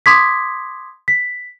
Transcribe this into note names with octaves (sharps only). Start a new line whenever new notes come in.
C6 D6 D#6 G#6 B6
B6